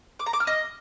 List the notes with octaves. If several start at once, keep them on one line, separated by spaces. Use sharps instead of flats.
D6
A#5
D6
F6
D#5